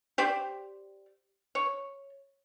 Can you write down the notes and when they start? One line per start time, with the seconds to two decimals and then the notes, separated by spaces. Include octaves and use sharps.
0.18 G4 C5 D5
1.55 C#5